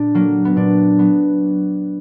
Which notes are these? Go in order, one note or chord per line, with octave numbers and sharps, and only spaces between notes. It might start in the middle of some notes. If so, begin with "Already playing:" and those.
Already playing: A#2 D4
F#3 A#3
B3
A#2 D4
F#3 B3